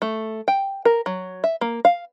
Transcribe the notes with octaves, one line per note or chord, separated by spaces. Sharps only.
A3
G5
A#4
F#3
E5
A#3
F5